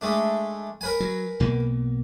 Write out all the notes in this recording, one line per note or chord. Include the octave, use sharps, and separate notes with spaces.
G#3 A3 D4
A#4 B4 G#5
F#3
B1 B2 A#3